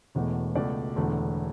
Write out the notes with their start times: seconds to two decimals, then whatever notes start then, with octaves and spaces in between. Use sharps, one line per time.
0.15 E1 E2 B2 A3
0.55 C#2 B2 A3 D5
0.96 E1 E2 D3 A3